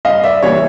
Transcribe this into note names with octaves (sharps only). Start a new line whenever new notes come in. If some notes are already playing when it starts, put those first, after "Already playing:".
G2 D#5 F5
D5 E5
E3 G3 A#3 C#5